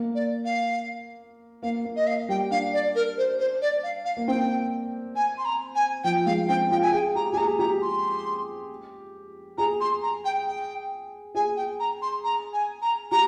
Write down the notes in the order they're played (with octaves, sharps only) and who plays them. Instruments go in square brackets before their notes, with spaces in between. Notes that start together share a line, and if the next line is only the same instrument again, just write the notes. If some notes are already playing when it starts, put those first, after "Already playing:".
Already playing: [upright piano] A#3
[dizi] D5
F5
[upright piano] A#3 [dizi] F5
[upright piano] A#3
[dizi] D#5
F5
[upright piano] G3 [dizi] G5
[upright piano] D4 [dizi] F5
[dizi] D5
A#4
C5
C5
D5
F5
F5
[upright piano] A#3
[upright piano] C4 [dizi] G5
[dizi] G#5
C6
A#5
G#5
[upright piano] F3 [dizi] G5
[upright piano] G#3 [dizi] F5
[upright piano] C4 [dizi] G5
[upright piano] F4 [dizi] G5
[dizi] G#5
[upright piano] G#4 [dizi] G5
[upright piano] G4 [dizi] A#5
[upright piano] G4 [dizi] G#5
[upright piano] G#4 [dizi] A#5
[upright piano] G4 [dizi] A#5
[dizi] C6
[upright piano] G#4 [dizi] A#5
[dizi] C6
A#5
G5
G5
[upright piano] G#4 [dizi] G#5
[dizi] G5
A#5
C6
A#5
G#5
A#5
[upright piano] G4 [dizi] A#5